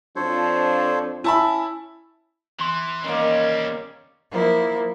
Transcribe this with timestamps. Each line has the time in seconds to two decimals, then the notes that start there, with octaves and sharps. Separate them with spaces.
0.16 F2 F3 D4 A4 C5 C#5
1.24 C#4 E4 A5 B5
2.60 E2 E3 C6
3.04 D#3 G3 A#3 C4 C#4 C#5
4.31 F3 A#3 E4